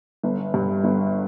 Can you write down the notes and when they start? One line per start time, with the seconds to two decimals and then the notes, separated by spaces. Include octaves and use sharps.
0.23 G1
0.54 G2
0.84 G1